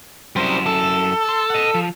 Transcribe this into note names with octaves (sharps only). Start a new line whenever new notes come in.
F#2 G3 E4 C5
A4
C6
D#5 F#5
F3